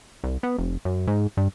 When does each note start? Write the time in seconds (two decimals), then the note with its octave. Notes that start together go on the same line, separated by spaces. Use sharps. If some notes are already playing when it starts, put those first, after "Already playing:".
0.24 C2
0.43 B3
0.58 F1
0.85 F#2
1.07 G#2
1.37 G2